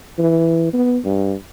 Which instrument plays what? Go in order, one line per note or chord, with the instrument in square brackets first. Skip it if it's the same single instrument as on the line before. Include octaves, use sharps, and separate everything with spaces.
[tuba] E3
B3
G2